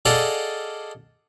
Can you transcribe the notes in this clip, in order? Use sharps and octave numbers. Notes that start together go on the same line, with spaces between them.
G#4 A4 D5 D#5 F5 F#5